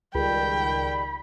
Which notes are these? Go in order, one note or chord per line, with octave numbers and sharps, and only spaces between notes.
C#2 D#3 G3 G5 B5